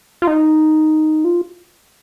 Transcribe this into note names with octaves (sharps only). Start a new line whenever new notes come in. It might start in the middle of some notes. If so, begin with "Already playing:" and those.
F4
D#4
F4